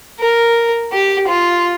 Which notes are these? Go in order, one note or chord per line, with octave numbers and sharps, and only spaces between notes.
A#4
G4
F4